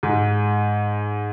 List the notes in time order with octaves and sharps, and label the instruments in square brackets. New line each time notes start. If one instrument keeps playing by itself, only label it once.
[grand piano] G#2